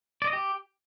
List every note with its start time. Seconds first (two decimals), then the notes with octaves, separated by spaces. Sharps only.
0.22 D5
0.27 D#5
0.33 G4